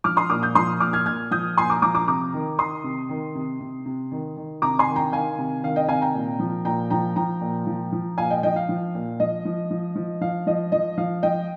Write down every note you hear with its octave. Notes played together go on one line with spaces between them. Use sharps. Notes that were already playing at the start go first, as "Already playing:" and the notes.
F3 D6 F6
C6 D#6
A#2 D6 F6
D#6 G6
F3 C6 D#6
A#2 D6 F6
F6 G#6
A#2 F6 G#6
F3 D#6 G6
A#2 G#5 C6
A#5 D6
F3 A#5 D6
A#5 D6
C3 A#5 D6
D#3
D#3 C6 D#6
C3
D#3
C3
C3
C3
D#3
D#3
C3 A#5 D6
G#5 C6
D#3
G5 A#5
D#3 F5 G#5
C3
D#3 F5
D#5 G5
C3 F5 G#5
G5 A#5
A#2
F3
A#2 G5 A#5
F3 G5 A#5
F3 G5 A#5
A#2
F3
F3
A#2 F5 G#5
D#5 G5
F3 D#5 G5
F5
F3
A#2
F3 D#5
F3
F3
F3
F3 F5
F3 D#5
F3 D#5
F3 F5
F3 D#5 G5